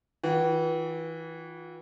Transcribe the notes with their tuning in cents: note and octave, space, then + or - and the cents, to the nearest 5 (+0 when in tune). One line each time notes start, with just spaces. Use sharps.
E3 -25 F4 +30 G5 -45